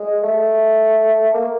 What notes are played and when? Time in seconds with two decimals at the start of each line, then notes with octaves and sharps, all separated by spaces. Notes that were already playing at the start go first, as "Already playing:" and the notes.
Already playing: G#3
0.23 A3
1.34 A#3